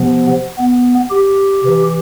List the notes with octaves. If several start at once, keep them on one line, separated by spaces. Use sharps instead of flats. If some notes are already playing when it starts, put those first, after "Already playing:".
Already playing: C3 F3 B3
B3
G4
C3 E3